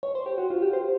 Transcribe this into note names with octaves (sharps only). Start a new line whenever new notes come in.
C#5
C5
G4
F#4
F4
G4
C5